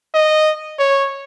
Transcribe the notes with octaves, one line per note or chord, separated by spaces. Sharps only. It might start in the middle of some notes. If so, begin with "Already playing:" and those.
D#5
C#5